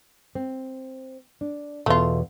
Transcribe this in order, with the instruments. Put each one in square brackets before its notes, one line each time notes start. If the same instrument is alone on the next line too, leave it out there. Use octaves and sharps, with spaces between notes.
[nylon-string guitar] C4
D4
[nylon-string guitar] E2 B2 [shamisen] A3 F4